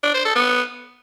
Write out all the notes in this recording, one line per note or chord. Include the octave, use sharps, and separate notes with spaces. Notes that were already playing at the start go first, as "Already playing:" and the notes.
D4
C5
A4
B3